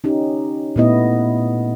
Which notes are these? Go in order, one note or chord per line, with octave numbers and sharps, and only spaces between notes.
C#4 D#4 G4
A#2 A3 B3 E4 D#5